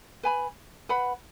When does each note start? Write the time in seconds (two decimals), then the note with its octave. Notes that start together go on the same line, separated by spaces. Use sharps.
0.23 B4 G#5 B5
0.89 B4 F#5 B5